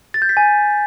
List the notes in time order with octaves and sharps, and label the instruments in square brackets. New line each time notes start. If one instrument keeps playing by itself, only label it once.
[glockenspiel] A6
G6
B6
G#5